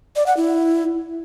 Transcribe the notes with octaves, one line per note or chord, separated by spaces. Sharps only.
D5
F#5
E4